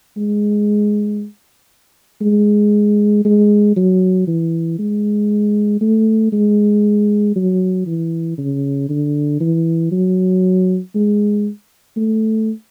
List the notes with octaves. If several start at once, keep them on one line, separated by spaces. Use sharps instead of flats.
G#3
G#3
G#3
F#3
E3
G#3
A3
G#3
F#3
E3
C#3
D3
E3
F#3
G#3
A3